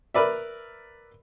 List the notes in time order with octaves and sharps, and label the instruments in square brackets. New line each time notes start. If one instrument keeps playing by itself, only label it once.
[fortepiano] A#4 B4 D5 E5